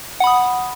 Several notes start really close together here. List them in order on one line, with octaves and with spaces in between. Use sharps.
F#5 B5 D#6